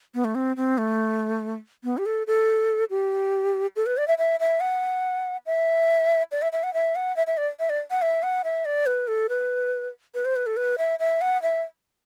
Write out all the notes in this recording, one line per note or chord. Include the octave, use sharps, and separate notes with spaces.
B3
A3
C4
C4
A3
B3
G4
A4
A4
G4
A4
B4
D5
E5
E5
E5
F#5
E5
D5
E5
E5
F#5
E5
F#5
E5
E5
D5
E5
D5
F#5
E5
F#5
E5
D5
B4
A4
B4
B4
C5
B4
A4
B4
E5
E5
F#5
E5